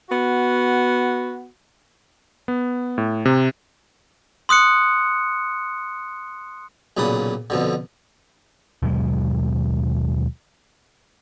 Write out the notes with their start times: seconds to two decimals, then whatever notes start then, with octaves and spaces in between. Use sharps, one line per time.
0.09 B3 F#4
2.48 B3
2.98 A2
3.25 C3
4.49 C6 D#6 F#6 C#7
6.97 B1 A#2 C#3 D5 B5 D#6
7.50 F2 B2 D3
8.82 D#2 B2 F#3 G#3